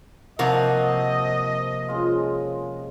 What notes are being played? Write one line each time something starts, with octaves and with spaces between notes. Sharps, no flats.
C3 F3 A#3 F#4 A#4 D#5
C#3 G#3 F4